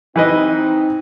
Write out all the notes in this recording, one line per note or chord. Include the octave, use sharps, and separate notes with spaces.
E3 C4 D#4 B4 D#5